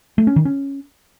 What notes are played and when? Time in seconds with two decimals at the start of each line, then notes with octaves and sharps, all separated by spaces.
0.18 A3
0.27 C#4
0.36 D#3
0.45 C#4